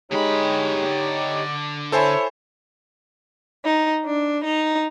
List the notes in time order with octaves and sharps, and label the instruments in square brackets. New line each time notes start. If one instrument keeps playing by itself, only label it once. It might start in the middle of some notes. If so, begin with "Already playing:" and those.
[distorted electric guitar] D3 B5 [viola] G#3 [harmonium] D#4 G4 C#5
[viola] D5
[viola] E4 C#5 [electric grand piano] A4 C5 G#5
[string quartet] D#4
D4
D#4